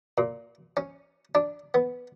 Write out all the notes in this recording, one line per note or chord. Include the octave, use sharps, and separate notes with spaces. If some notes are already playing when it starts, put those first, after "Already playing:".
A#2
C#4
D4
B3